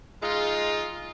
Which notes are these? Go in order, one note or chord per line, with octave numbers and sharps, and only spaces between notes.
G#3 D#4 F4